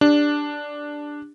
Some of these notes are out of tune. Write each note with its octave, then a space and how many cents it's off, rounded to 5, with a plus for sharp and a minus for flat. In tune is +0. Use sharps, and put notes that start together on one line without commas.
D4 +0 G4 +30